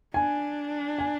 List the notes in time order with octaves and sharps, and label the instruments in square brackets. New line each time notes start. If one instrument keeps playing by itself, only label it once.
[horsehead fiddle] D4 [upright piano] G#5
[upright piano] G#5